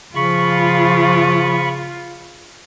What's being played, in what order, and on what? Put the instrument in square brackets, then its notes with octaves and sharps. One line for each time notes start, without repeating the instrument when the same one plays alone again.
[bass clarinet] C#3 [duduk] F3 [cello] F4 [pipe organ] B5 C#6